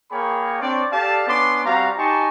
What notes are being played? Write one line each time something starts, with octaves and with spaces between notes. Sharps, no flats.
A#3 G#4 A#4 C#5 G5 B5
C4 D4 C#5 D5
G4 A4 D5 F5 A5
B3 C#4 D4 C6 D6
G3 C4 F#4 F5 A#5
D#4 G4 G#5 A5 C6 C#6